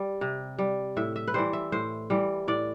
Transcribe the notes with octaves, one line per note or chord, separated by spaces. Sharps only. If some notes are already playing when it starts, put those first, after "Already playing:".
Already playing: G3
C3
G3
A2 E5
E5
B4
E3 G3 C5
E5
A2 C5
E3 G3
A2 D5